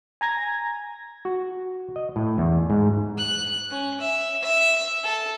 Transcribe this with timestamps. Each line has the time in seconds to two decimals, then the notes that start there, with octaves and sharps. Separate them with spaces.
0.21 G#5 A#5 G#6 A#6
1.25 F#4
1.96 D#5
2.16 A2
2.38 E2
2.70 G#2
3.18 F#6
3.70 C#4
4.00 E5
4.42 E5
5.03 A4